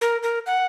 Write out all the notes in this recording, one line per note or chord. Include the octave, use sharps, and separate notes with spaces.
A#4
A#4
F#5